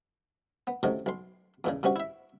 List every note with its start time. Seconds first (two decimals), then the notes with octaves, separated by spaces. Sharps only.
0.67 B3
0.83 F#2 A2 C3 D#3 F#3
1.06 B1 C6
1.64 E2 A#2 C#3
1.83 G2 C3 C#4 F#4
1.96 E4 E5